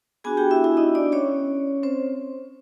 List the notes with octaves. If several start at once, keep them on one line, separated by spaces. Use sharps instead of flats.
B3 D4 F#4 G#4 G#5
G4 G5
E4 E5
E4 E5
D#4 D#5
D4 D5
C#4 C#5
C4 C5